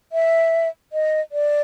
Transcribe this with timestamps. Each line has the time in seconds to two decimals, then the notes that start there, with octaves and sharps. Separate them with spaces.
0.12 E5
0.93 D#5
1.32 D5